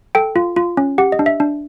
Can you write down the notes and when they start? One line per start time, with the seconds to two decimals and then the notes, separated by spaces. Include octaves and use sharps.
0.15 A4 G5
0.36 F4
0.56 F4
0.77 C#4
0.98 G4 F#5
1.12 D#5
1.19 D4
1.26 E5
1.40 D4